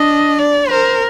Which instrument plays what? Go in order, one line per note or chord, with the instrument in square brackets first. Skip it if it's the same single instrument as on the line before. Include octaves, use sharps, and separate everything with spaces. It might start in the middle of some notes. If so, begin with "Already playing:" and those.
Already playing: [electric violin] D4 [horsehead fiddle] D#5
[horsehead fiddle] D5
[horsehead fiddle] A#4 [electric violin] C5